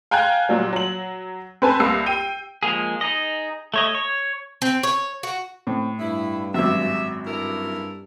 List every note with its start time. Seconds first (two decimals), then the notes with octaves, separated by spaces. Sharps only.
0.11 F5 G5 G#5 A#5 F#6 G#6
0.49 A#2 F#3 G3
0.73 F#3 F#7
1.62 C4 B4 G#5 A5
1.80 C2 A#3 E6 C7
2.06 G5 D#7
2.63 F3 G#3 A#3 G#4
3.01 D#4 G#4 D#5
3.74 A3 C#5 D#5
3.95 C#5
4.62 C4
4.83 C#5
5.23 F#4
5.67 A2 C4
5.99 G2 E4
6.54 G#1 F#2 E5
7.26 G2 E4 A4 A#4